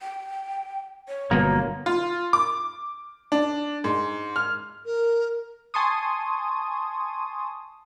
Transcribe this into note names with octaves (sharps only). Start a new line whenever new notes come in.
G5
C#5
G1 B2 D3 F#3 A#3 B3
F4
D6
D4
G#2
F6
A#4
G#5 A5 C6 C#6 D#6